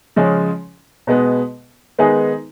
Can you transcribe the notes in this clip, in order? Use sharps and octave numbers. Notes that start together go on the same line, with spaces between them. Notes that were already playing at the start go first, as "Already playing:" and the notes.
C#3 F3 G#3 C#4
B2 G#3 B3
D#3 G#3 B3 D#4 G#4